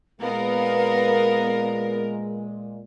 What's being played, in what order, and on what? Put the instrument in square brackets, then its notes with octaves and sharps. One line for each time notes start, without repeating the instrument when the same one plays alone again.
[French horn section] A#2 G#3 [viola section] B3 [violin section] A#4 [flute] F5